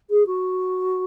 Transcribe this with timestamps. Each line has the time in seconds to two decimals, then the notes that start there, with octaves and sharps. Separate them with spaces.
0.10 G#4
0.26 F#4